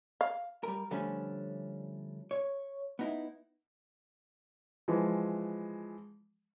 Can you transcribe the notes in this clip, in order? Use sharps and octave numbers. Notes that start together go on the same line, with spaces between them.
F5
G3 A#4
D3 F3 G3 A3 C#4 D4
C#5
B3 D#4 E4
E3 F3 G#3